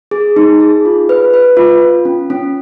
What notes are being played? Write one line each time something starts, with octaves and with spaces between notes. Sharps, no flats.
G#4
D#4
G#4
F4
B4
B4
F4
F4
C#4
C#4